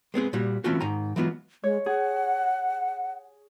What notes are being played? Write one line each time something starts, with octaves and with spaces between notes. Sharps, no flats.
G#3 B3 C4 G#4
A#2 G3 F#4
E3 A3 C4 C#4 F4 F#4
G#2 D#3 G#5 A#5
E3 F#3 G#3 B3 F4 F#4
G#3 C#5
G#4 F#5